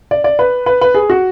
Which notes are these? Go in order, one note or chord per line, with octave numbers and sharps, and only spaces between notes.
D5
D5
B4
B4
B4
G#4
F#4